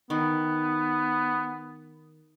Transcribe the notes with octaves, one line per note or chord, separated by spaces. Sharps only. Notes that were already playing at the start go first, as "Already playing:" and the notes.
D#3 B3